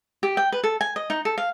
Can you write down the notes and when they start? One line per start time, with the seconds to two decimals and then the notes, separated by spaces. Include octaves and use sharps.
0.23 G4
0.37 G5
0.52 B4
0.64 A4
0.81 G#5
0.96 D#5
1.10 D#4
1.25 A4
1.38 F5